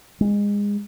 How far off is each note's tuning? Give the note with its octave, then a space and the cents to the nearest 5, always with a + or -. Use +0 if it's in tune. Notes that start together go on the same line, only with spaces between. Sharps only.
G#3 -25